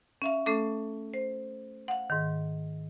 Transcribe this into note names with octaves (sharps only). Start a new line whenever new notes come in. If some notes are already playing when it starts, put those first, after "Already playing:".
C#4 E5 F5
A3 C#4 A4 D6
C5
F5 F#5
G#2 D#3